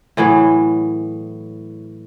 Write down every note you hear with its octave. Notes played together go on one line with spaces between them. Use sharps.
A2 E3 F#3 G#4